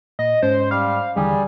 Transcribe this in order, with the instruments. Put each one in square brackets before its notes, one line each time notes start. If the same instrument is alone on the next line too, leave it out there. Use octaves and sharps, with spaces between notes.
[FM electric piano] A#2 [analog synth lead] D#5
[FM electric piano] G#2 C#4 [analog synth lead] C5
[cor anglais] G3 [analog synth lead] F5
[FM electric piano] D#2 D3 E3 [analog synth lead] G3 [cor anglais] G#4